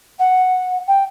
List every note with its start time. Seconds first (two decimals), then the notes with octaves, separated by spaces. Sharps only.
0.18 F#5
0.87 G5